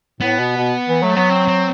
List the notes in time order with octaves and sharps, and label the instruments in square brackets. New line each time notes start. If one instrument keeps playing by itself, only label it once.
[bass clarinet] A2 [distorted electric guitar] B3
[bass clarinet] B2
B2
E3
[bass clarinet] F#3 [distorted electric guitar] A3
[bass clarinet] F#3 [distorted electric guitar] B3
[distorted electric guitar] C4
C4